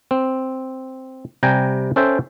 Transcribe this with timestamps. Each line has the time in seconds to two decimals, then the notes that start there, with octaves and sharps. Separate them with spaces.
0.11 C4
1.43 C3 G3 G5 G#5 A#5
1.96 C#4 A4 C5 E5 G5